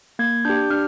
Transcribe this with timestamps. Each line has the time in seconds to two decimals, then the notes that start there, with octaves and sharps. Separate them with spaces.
0.19 A#3 G#6
0.45 D4 G4 G6
0.70 D4 F6